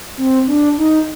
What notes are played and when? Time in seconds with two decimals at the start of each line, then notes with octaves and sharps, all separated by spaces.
0.18 C4
0.47 D4
0.78 D#4